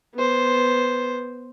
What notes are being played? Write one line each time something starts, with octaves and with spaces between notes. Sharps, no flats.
B3 C5